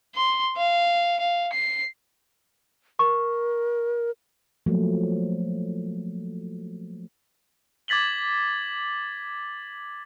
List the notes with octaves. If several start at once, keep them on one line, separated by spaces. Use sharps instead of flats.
C6
F5
F5
C7
A#4 C#6
F3 F#3 A3 A#3
D6 G#6 A6 B6 F#7 G7